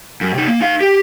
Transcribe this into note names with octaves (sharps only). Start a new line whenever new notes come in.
F#2
C3 D#4
A#3
D#4 F5
G4